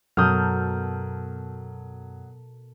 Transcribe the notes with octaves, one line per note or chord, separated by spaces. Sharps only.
F#2 B2 F#3 A4 A#4 D#6 F6 G6